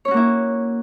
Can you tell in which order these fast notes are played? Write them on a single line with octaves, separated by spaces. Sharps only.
C#5 C#4 F#4 A#3 E4